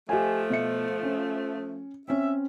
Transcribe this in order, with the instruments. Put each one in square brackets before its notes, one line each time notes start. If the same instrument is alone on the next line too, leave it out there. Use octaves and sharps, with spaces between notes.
[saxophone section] F3 A3 [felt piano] G4 D#5 G#5
[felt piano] B2 E5 C#7
C#4
[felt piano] C4 C#4 [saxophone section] E5